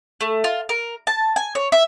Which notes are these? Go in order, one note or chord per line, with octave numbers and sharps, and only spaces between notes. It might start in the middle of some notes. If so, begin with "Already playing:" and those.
A3
F4
A#4
A5
G#5
C#5
E5